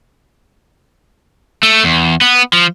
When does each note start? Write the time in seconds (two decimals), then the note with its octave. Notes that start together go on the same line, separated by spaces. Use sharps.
1.63 A3
1.84 E2
2.21 B3
2.53 F3